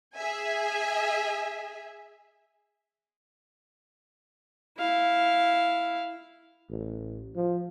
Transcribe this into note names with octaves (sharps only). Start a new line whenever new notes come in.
G#4 E5 G#5
E4 F5
A1
F3